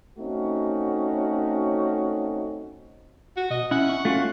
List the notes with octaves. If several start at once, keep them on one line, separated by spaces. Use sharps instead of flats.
A3 C4 C#4 D#4 F#4
F#4
B2 D#5
C#4 E4 F#5
C#6
A3 C#4 F4 F#4